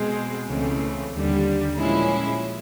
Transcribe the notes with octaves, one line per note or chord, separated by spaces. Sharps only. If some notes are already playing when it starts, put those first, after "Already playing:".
Already playing: B2 G#3 C4
C#2 C#3 E3 A3 C4
D#2 D3 G3
A#2 F3 G#3 C#4 E4